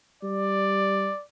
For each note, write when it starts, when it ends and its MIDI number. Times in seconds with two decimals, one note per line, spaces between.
0.23 1.10 55
0.23 1.23 74